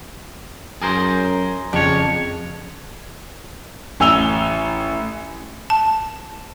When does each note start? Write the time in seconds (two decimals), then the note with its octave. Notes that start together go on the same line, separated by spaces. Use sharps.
0.82 F#2 G#4 A#4 C5
1.73 F2 C#3 D4 C#5
4.00 A1 G#5 E6 F7 G7
5.70 A5